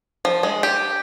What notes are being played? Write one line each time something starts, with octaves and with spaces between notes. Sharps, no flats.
F3
G#3
G4